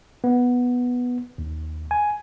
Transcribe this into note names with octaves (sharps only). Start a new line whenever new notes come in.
B3
D#2
G#5